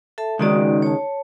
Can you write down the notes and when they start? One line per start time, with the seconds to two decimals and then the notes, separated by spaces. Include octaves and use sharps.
0.18 A4 E5 A5
0.39 C#2 D#3 G#3 D#4 F#4 D5
0.82 C#5 A5